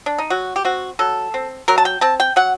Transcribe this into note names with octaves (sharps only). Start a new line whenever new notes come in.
D4
D#4
F#3 F#4
G4
C4 F#4
F#3 A4
C4
F#3 A#4
A5
G5
C4 A5
G5
F#3 F#5